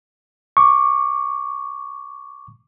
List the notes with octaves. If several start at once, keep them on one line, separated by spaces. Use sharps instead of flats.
C#6 D6